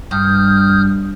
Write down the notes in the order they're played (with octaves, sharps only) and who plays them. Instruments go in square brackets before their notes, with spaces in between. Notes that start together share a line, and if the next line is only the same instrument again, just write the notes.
[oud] G2 [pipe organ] D#6 F6 G6